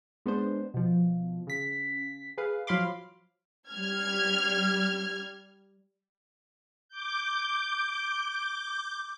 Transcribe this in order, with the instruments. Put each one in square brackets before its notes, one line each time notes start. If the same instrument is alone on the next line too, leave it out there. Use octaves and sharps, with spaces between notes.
[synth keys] G#3 B3 D4 C5
B2 F3
C#3 B6
G#4 B4 F5
F3 F#3 F5 B5 C6 D6
[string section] G3 F6 G#6
[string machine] D6 G6